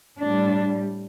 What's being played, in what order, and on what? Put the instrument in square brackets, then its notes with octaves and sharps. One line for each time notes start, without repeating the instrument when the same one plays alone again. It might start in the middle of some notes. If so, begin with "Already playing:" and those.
[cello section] A2 G3 D4